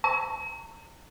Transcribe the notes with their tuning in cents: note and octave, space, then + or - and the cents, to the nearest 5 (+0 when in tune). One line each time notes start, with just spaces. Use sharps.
A#5 -30